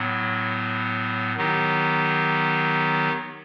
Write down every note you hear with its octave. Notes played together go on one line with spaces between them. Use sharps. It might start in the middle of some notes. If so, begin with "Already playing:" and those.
Already playing: A2 F#3 B3
D#3 F#3 B3 D#4 G4